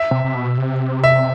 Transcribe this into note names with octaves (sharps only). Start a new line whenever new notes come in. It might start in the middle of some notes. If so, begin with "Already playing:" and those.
Already playing: E5
C3
C3
B2
C3
E5